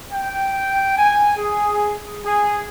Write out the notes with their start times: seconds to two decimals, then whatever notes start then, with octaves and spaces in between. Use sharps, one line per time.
0.12 G5
0.98 G#5
1.37 G#4
2.26 G#4